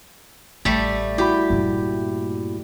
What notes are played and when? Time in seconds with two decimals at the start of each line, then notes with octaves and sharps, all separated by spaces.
0.65 A1 G3 A3
1.18 E4 F#4 G4 B5
1.50 G2 A#2